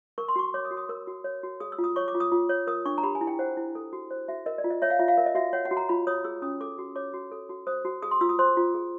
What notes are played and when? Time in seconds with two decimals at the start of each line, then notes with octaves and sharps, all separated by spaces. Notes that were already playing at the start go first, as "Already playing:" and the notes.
0.18 A#4 C#6
0.28 C6
0.36 F#4 C#6
0.54 C#5 D6
0.65 D#6
0.71 F#4
0.77 D#6
0.89 A#4 E6
1.07 F#4
1.24 C#5
1.43 F#4
1.60 G#4 D#6
1.72 E6
1.79 F4
1.84 D#6
1.96 C#5 C#6
2.08 D6
2.15 F4
2.20 D#6
2.32 F4
2.49 C#5
2.67 A#4 D#6
2.85 D4 C#6
2.98 A#5
3.03 G4 B5
3.15 G#5
3.21 E4
3.27 G5
3.39 C5 F#5
3.57 E4
3.75 A4
3.93 F#4
4.11 C5
4.28 F#4 E5
4.46 A#4 D#5
4.58 D5
4.64 F4
4.70 D#5
4.82 C#5 E5
4.90 F5
4.99 F4 E5
5.08 F5
5.18 A#4 E5
5.26 D#5
5.35 F#4 E5
5.53 C#5 F#5
5.65 F#5
5.71 F#4
5.77 A#5
5.89 F4 B5
6.07 C#5 D#6
6.24 G#4 E6
6.42 C#4 D#6
6.61 A4 D6
6.78 F#4
6.96 C#5 D6
7.14 F#4
7.32 A4
7.49 F#4
7.67 C5 D#6
7.85 F#4
8.02 G#4 D#6
8.11 C6
8.21 F4 E6
8.29 D#6
8.39 C5 C6
8.57 F4
8.74 G#4